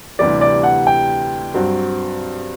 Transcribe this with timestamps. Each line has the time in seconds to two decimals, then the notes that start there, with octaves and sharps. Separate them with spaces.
0.19 D2 C3 E3 G3 D5
0.41 D5
0.64 F#5
0.87 G5
1.54 G2 F#3 C4 F#4